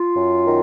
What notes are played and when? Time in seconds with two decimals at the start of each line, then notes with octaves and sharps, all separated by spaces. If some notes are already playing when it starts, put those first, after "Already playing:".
Already playing: F4
0.16 F#2
0.46 D#3